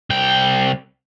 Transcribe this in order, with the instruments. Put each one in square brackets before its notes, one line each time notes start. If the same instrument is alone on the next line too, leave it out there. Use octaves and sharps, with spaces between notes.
[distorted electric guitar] C2 G5